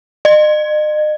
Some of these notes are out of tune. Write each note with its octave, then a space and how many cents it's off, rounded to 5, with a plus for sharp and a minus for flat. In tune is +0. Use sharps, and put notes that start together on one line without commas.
D#5 -40